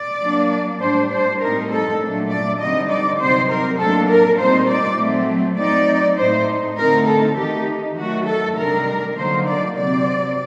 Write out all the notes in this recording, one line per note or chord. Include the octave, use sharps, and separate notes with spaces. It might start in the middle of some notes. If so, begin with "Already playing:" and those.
Already playing: D5
F#3 A#3 D4
A2 G3 D4 C5
C5
A2 G3 C4 D#4 A#4
A4
A#2 F#3 A3 D4
D5
D3 G3 C4 D#4 D#5
D5
C3 F#3 C4 D#4 C5
A#4
A2 F#3 A#3 D4 A4
A#4
A#2 G3 C4 D#4 C5
D5
F#3 A3 C4
F#3 C4 D#4 D5
A2 A3 D#4 C5
D3 A3 C4 D#4 A#4
A4
D#3 A3 D#4 G4
D#3 F#3 A3 F#4
A4
C3 D#3 G3 D4 A#4
D3 F#3 A#3 D#4 C5
D5
C3 F#3 C4 D5